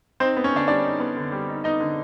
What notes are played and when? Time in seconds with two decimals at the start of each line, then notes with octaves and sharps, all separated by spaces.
0.20 C4 D#4 C5
0.37 B3
0.44 C#4 C#5
0.52 D3 D4 D5
0.68 G3 D4 D5
0.84 D#4
1.00 B3
1.17 D3
1.32 G3
1.49 D#4
1.64 B3 D#4 D#5
1.80 D3